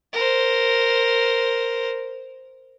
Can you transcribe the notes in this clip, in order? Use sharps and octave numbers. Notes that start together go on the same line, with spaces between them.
A#4 C5